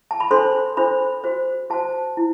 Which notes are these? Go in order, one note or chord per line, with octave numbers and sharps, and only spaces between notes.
A5
B5
D4 A4 C5 C6
D4 A4 C5 B5
F#4 C5
F#4 C5 A5
E4